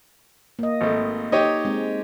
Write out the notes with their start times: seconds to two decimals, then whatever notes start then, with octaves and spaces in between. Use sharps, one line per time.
0.59 A#3 D#5
0.81 G#1 A3
1.32 D#4 G4 C#5 D#5
1.65 G#3 C4